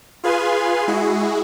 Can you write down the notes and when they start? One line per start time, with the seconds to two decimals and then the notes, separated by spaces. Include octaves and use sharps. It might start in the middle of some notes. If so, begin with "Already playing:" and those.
0.24 F4 G#4 B4 F5 G#5 C6
0.88 G#3 E4 F#4 G#4